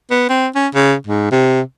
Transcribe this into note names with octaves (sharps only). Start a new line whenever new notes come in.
B3
C4
C#4
C#3
G#2
C3